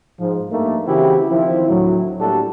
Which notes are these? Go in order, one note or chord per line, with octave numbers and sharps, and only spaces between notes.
G#2 F3
G2 A3 A#3 D#4
C#3 E3 C4 E4 F#4 G4
D#3 F3 C4 E4
D2 A2 F#3
A2 G3 A#3 D4 F#4 A4